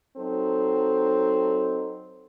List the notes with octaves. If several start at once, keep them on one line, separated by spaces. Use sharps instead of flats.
F#3 C4 D#4 A4